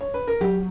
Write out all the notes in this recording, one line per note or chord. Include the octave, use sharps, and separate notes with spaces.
C#5
B4
A#4
F#3 G4